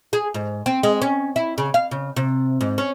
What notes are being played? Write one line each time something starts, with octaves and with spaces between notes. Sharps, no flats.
G#4
G#2
C4
G#3
C#4
E4
C#3
F5
C#3
C3
G#2
C#4